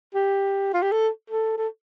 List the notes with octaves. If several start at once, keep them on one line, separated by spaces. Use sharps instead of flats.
G4
F4
G4
A4
A4
A4